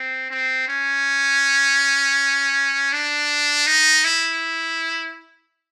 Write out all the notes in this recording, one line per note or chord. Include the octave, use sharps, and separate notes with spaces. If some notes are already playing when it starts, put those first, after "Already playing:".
Already playing: C4
C4
C#4
D4
D#4
E4